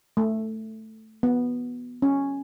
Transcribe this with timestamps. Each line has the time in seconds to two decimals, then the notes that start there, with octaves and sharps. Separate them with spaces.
0.17 A3
1.23 B3
2.02 C#4